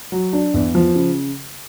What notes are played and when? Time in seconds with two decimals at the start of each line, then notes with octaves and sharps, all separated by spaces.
0.12 F#3
0.33 D4
0.54 E2
0.75 F3
0.96 C#3